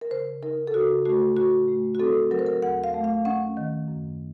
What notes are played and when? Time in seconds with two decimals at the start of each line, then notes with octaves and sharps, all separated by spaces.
0.01 A#4
0.11 C#3 C5
0.43 D#4 A#4
0.67 A4
0.74 C#3 F#4
1.05 A3 F#4
1.37 A2 F#4
1.68 A3
1.95 F#4
2.00 C4 A4
2.31 F#3 A#4
2.39 C5
2.46 A#4
2.62 D#2 F#5
2.84 F5
2.94 A3
3.04 F5
3.25 C#4 F#5
3.57 D#3
3.88 F#2